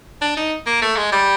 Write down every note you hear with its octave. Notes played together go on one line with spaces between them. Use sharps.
D4
D#4
A#3
A3
G#3
G3